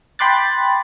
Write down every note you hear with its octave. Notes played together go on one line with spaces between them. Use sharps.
G5 B5 C6 D6 F#6 A6